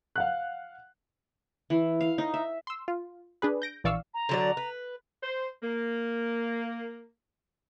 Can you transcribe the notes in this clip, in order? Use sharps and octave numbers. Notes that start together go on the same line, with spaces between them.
F5 F#5 F#6
E3
F5
D#4
E5
C6 E6
F4
D4 G#4 B4
G6 A#6 D7
A#1 E3 D5 F5 C#6 E6
A#5
D3 F#3 D5
B4
C5
A#3